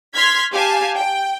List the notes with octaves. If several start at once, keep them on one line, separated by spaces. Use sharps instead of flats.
C6 F6 G#6 B6
G4 F5 G#5 A5
G5